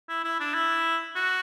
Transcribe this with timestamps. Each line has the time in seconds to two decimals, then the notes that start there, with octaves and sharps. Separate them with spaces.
0.09 E4
0.24 E4
0.40 D4
0.54 E4
1.16 F#4